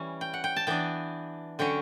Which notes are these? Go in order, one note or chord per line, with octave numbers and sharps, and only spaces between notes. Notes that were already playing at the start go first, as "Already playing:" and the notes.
Already playing: E3 G3 C#4
G5
F#5
G5
A5
E3 B3 D4 G5
D3 F#3 C#4 G5